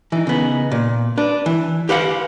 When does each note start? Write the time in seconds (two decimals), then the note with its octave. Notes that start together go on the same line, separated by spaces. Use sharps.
0.12 E3 D#4
0.27 C#3 B3 D#4
0.72 A#2
1.18 D4 B4
1.46 E3
1.89 G4 B4 F5 F#5